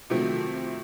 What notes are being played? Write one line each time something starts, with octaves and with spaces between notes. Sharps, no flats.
C3 D#3 F3 F#3 A3 C4